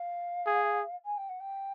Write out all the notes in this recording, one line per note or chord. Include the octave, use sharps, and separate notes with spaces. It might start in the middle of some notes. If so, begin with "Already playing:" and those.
Already playing: F5
G#4
G#5
G5
F#5
G5